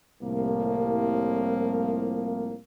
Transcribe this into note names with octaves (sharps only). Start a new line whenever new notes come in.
C2 A2 F3 A#3